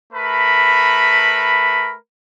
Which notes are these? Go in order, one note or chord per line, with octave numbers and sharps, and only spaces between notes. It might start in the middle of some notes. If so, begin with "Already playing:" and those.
A3 A#4 B4 B5